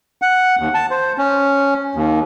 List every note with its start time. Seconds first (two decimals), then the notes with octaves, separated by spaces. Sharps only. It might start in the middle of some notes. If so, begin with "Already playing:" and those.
0.22 F#5
0.59 D#2
0.74 A5
0.91 C5
1.18 C#4
1.95 D#2